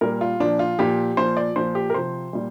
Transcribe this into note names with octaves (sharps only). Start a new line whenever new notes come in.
A#2 G3 A#4
F4
A#2 F3 D4
F4
A#2 F3 G4
A#2 F3 C5
D5
A#2 F3 C5
G4
A#4
C3 F3 C5
A#2 G3